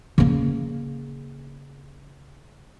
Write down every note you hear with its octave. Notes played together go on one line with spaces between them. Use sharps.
C#3 A#3